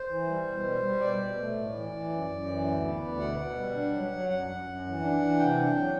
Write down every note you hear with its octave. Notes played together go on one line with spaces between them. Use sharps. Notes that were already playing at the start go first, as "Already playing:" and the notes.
Already playing: C5
E3
G3
B2
G3
G3
B2 D5
B2
A3
A2
E3
E3
F#2
F#2
E3
D2
B3
D2
B2 F#5
B2
G3
D4
F#3
F#3
F#2 F#5
F#2
F#2
E3
D4
E3
C3 G5
D4
F#3